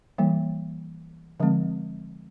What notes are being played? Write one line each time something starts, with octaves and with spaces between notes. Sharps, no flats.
E3 G3 A#3
D3 F3 G#3 C4